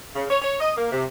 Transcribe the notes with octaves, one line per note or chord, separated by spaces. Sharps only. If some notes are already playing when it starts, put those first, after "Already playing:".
C#3
C#5
C#5
D#5
A#3
C3